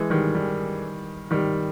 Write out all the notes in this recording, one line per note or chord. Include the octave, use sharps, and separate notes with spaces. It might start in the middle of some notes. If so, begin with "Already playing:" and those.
Already playing: E3 G#3
D#3 G3
D#3 G3
D#3 G3